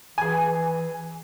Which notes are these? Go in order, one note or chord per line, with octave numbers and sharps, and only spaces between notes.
E3 G#4 G#5